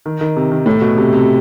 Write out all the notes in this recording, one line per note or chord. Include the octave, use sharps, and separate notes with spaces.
D#3
D#3
C3
D#3
A2
B2
C3
C3